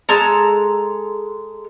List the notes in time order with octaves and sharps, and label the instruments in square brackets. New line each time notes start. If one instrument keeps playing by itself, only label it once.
[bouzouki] G#3 A4 A#5